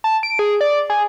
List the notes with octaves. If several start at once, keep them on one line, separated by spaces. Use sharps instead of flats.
A5
D7
G#4
D5
G#4